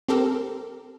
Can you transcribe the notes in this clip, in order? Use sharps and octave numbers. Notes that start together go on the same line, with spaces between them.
C4 G4 A4 A#4